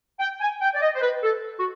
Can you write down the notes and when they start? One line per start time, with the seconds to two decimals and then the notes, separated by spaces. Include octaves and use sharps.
0.20 G5
0.40 G#5
0.61 G5
0.74 D5
0.81 D#5
0.95 C5
1.02 B4
1.23 A4
1.58 F#4